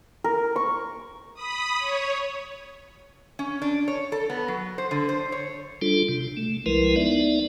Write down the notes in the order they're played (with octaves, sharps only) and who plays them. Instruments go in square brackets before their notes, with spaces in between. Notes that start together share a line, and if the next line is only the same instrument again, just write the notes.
[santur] A#4
C#6
[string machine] B5 D#6
C#5
[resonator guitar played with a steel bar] C#4
D4
C#5
A4
B3
F#3
C5
D3
C5
C#5
[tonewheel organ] G3 D4 F4 A4
C3
A3
C2 F3 G#3 E4 A#4 B4
B3 D#4 D5 E5